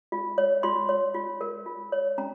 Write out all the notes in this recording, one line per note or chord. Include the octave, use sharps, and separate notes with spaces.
F4
C#5
F4 C6
C#5
F4
A#4
F4
C#5
C#4 A#5